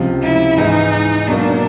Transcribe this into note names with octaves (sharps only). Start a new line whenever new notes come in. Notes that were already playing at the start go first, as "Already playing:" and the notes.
Already playing: C#2 C3 F3
E4
G#2 E3 G#3 D#4
B2 F#3 A#3 D4